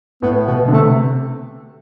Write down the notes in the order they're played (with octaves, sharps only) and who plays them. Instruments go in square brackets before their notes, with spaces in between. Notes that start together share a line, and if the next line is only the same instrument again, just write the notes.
[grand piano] A2 [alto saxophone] B3
[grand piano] B2 [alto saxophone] B3
[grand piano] D3
[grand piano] C3 [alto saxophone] A3